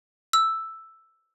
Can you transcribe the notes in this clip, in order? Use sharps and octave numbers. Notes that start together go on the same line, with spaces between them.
E6